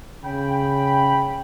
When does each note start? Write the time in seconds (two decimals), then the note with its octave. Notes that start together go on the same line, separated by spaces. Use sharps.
0.25 C#3 G5 B5